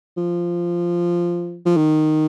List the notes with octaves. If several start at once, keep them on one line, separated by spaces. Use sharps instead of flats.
F3
F3
D#3